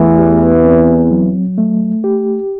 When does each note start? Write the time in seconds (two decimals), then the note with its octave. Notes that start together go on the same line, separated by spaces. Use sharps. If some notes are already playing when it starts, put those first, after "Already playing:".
Already playing: E2 E3 A3
0.18 G4
0.64 C4
1.11 F#3
1.58 A3
2.04 G4